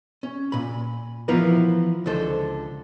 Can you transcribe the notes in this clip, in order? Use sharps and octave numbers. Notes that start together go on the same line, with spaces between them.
C#4
A#2 B5
E3 F3 B3 E4 A#4 B4
C#2 D3 A4 C5